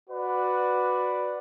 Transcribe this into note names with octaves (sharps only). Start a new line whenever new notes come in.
F#4 B4 D5